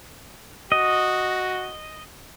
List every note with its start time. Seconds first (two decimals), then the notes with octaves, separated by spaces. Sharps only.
0.72 F#4 D#5